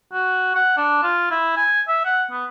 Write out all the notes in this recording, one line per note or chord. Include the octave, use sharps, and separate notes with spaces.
F#4
F#5
D4
F4
E4
G#5
E5
F#5
B3